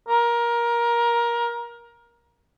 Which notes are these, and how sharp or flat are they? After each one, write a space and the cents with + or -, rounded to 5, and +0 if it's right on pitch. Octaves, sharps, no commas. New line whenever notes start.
A#4 +20